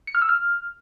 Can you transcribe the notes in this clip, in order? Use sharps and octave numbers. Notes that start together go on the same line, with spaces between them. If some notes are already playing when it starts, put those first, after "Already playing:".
C#7
F6
E6
F6